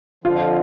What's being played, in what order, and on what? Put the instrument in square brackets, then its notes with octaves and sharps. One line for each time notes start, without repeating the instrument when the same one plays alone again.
[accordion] F2 D3 F3 [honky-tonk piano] F4